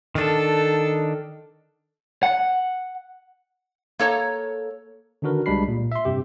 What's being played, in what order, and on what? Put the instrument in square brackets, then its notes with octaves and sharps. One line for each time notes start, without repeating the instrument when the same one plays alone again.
[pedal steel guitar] D#3 D4 [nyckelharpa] A4
[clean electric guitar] F#5
[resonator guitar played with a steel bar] A#3 A4 C#5 A#5
[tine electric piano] D3 D#3 D4 F#4 A#4 B4
C2 G3 G#3 D4 B5 C7
A#2
E5 C6
G2 C3 G4